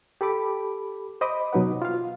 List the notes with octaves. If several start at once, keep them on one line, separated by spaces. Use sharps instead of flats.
G4 A4 B5 D6
C5 D#5 B5 D6 D#6
B2 F#3 D#4 B4 F#5
F4 F5